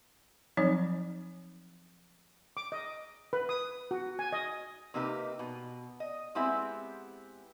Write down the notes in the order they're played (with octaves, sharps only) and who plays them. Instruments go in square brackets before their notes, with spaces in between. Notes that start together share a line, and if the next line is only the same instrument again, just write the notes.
[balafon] F3 F#3 C4 D#4 C#5 D#5
[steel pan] D6
D#5
B4
D#6
F#4
G#5
D#5
[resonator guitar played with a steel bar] C3 A#3 D#4 G4 B4
B2
D#5
G#3 B3 C4 E4 G4 E5